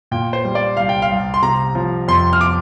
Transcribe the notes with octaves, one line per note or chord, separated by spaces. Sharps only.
A#2 G5
C5
G3
D5
C2 F5
G5
F5
C2
C6
C3 A#5
F3
F2 C6
F6
D6